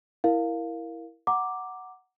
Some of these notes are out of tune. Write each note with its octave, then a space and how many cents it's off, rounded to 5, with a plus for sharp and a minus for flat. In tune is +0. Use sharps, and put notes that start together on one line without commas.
E4 +0 A#4 +0 F5 +0
F#5 +0 A#5 +0 D6 +0